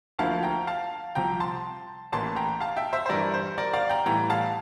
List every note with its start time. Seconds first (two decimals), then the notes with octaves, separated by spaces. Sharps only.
0.19 D2 D3 F3 A#3 E4 F5 A5
0.43 G5 A#5
0.67 F5 A5
1.15 C2 C3 F3 G5 A#5
1.40 A5 C6
2.12 A1 A2 E3 A#3 A5 C6
2.36 G5 A#5
2.60 F5 A5
2.77 E5 G5
2.93 C5 E5
3.06 C5
3.09 G2 E3 G3 A#4 D5
3.34 C5
3.58 A#4 D5
3.73 D5 F5
3.89 G5 A#5
4.06 A2 E3 G3 G5 A#5
4.30 F5 A5